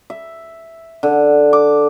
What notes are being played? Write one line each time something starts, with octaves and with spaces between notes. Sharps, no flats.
E5
D3
D6